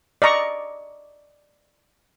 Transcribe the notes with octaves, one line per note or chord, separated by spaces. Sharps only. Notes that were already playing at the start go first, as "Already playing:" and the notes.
D5 D#5 A#5 C#6